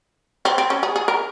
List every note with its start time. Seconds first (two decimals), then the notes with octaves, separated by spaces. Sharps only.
0.45 C4
0.58 C4
0.70 C#4
0.83 G#4
0.96 G#4
1.08 A#4